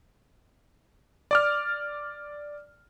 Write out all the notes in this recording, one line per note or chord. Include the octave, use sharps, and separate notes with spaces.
D5 D6 F6